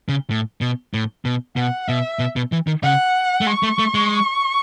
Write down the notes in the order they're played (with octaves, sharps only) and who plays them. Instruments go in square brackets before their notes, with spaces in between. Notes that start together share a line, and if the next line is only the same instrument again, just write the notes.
[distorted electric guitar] C#3
A2
B2
A2
B2
[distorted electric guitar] B2 [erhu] F#5
[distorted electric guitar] B2 [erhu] E5
[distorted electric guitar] B2
B2
E3
D#3
[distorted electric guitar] C#3 [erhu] F#5
[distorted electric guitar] A3
[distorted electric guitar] G#3 [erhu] C#6
[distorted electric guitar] A3
A3
G#3